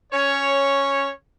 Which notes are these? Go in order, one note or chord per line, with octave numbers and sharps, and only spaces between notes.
C#4 C#5